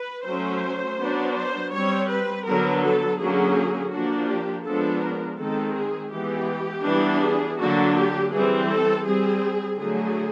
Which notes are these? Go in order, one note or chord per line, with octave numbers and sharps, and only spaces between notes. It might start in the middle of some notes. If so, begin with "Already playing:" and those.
Already playing: B4
F#3 A3 C#4 C5
F#3 B3 D4
C5
G3 C4 C#5
B4
D3 F#3 B3 A#4
A4
D3 F#3 A#3 C#4 G#4
F3 A#3 D4 F#4
G4
F3 G#3 B3 D4 A4
A#4
D#3 G#3 C4 A4
G#4
E3 G#3 B3 G4
E3 G3 B3 D4
G#4
D3 F#3 A#3 D4 F#4
G4
E3 G3 C4 G#4
A4
G3 C4 G#4
D3 F#3 A3 G#4